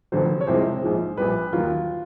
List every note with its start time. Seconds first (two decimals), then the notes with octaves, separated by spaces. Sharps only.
0.12 F1 F2 D3 F#3 C5
0.41 C#5
0.47 C2 C3 F3 G#3 C5
0.82 A#1 G#2 F3 G#3
1.17 A#1 A#2 G3 B4
1.53 D#2 D#3 F#3 F4